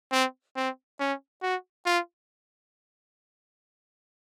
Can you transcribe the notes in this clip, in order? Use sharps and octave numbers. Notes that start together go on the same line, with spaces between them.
C4
C4
C#4
F#4
F4